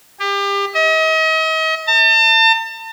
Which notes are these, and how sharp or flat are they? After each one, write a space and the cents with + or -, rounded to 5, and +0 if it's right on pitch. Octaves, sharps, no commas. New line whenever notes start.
G4 +30
D#5 +40
A5 +40